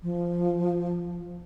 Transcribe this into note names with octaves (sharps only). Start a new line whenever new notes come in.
F3